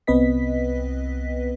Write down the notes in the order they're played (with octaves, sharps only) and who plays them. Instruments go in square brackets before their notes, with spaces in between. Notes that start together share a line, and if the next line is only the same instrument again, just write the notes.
[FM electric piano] C2 B3 C4 B4 D#5 B6